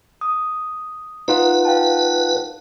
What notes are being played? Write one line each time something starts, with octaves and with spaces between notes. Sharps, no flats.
D#6
D#4 F4 B4 F#5
F5 G5 A5